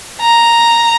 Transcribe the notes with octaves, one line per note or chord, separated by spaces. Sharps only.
A#5